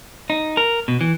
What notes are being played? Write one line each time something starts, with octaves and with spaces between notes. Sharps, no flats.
D#4
A#4
B2
E3